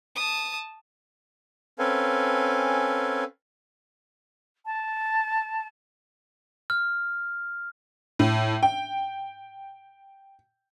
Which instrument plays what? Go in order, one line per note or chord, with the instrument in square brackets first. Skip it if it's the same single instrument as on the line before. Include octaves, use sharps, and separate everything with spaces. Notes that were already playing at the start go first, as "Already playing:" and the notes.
[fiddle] A5 D#6
[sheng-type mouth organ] C4 C#4 A4 B4 F5 G#5
[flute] A5
[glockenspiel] F6
[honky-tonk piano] A2
G5